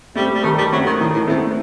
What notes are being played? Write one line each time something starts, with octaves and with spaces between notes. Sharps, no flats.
G3 A3 C4
G3
D#3 A3
G3
F#3 A3 C4
D#3
A2 D#3
A2
E2 A3 C4